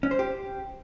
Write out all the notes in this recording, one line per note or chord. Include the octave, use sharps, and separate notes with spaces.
C#4
C5
G4